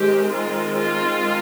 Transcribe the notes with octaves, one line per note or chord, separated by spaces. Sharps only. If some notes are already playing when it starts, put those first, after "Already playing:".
Already playing: D#3 G#3 C4 G4
F4
F4